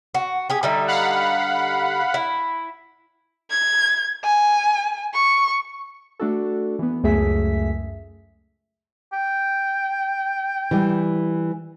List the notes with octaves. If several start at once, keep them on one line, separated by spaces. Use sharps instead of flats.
F#4
G4 G#4
D3 G3 D#4 E5
F5 F#5 B5
E4
G#6
G#5
C#6
A3 D4 F#4 A4
E3 B3
C#2 F#2 A3 G#4 E5 B6
G5
E3 G3